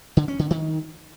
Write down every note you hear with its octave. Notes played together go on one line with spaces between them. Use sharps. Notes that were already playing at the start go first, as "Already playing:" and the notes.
D3
C#4
D3
D#3